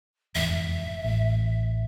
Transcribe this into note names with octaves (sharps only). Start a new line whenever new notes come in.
F1 E2 G#2 E5
A1